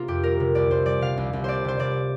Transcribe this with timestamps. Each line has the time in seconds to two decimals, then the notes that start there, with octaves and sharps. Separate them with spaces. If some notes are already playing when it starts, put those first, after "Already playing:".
Already playing: C3 A#3 F4
0.08 F2 G4
0.23 G3 A#4
0.40 C3
0.55 C2 D5
0.71 C2 C5
0.86 G3 D5
1.01 C3 F5
1.18 C2
1.33 C2
1.44 A#3 C5 D5
1.65 C3 C5
1.79 C2 D5